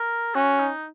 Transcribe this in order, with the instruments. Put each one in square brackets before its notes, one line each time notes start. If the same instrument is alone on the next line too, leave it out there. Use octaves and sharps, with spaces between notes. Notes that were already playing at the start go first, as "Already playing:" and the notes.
Already playing: [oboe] A#4
[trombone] C#4 [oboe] F#4
[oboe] D#4